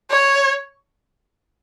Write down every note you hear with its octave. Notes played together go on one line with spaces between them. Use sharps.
C#5